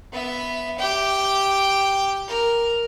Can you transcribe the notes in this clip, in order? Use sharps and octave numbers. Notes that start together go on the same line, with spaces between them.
B3 E5
G4 G5
A#4